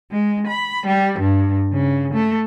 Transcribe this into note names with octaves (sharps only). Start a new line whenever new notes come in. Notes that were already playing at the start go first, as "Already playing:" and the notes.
G#3
B5
G3
G2
C#3
A3